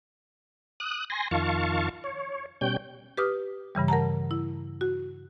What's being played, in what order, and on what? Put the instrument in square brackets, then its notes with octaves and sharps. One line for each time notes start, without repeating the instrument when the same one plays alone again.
[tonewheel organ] D#6 F#6
G#5 C6 A#6
F2 D#3 F4 F5 A5 C#6
C#5
B2 G3 C#4 G5 G6
[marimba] G4 B4 D6 D#6 F6
G2 C#3 E3 G3
A#4 F#5 A5 A#5
E4
F#4